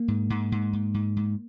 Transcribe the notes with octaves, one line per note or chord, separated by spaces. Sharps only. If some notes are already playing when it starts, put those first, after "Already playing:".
Already playing: A#3
G#2
G#2
G#2
G#2
G#2
G#2